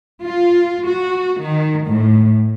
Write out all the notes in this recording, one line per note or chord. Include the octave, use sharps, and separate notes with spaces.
F4
F#4
D#3
A2